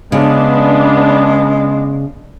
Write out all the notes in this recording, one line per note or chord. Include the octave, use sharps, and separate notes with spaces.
C#3 G#3 B3 D4